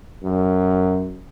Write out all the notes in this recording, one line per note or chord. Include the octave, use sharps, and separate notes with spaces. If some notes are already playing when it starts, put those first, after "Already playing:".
F#2